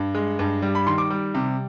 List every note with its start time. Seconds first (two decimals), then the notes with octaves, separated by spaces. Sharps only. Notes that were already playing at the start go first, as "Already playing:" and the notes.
Already playing: G2
0.15 G#3
0.39 G2
0.62 G3
0.75 B5
0.87 D#3 C6
0.98 D6
1.10 G3
1.34 C3